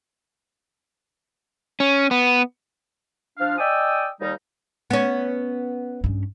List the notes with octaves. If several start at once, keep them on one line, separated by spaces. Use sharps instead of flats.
C#4
B3
F3 D4 F5
D5 D#5 G5 G#5 D#6 E6
D#2 G3 D#4
B3 C#4
G2 C#4